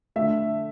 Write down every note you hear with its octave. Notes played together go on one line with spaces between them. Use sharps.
D3 A3 E5